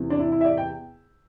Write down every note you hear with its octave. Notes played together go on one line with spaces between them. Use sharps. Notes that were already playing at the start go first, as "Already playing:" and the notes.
Already playing: E2 C3 E3
D4
E4
E4
E5
D5
G5